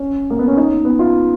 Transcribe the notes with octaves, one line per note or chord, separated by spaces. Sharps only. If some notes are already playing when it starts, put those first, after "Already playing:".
Already playing: C#4
A#3
B3
C#4
D#4
B3
F4